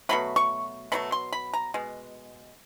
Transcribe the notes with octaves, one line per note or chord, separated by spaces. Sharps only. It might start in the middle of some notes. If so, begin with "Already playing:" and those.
B2 F#3 A3 B5
C#6
B2 F#3 A3 B5
C6
B5
A#5
B2 G#3